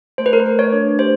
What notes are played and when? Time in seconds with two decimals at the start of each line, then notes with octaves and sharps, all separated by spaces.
0.18 A3 C5
0.26 B4
0.33 A#4
0.40 B4
0.46 A3
0.59 C#5
0.73 D4
0.99 G4 C5